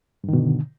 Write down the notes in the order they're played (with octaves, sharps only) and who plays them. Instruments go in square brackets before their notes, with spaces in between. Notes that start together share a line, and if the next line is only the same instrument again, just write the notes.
[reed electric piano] G2
D#3
B2
D3